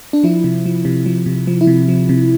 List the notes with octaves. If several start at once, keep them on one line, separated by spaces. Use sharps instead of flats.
D4
F3 E4
C3
F3
C3
F3
C3
F3
E4
C3
F3
C3